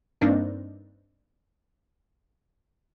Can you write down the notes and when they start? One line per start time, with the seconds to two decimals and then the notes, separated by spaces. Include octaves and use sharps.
0.21 G2 A#3 C4 D4 D#4